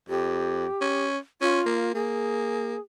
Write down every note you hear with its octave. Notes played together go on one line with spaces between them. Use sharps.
F2 G4
C#4
C#4 F4
A#3
A#3 G#4